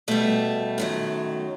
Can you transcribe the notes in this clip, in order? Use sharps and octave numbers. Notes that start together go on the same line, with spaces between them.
B2 G3 A3
F#2 D#3 F#3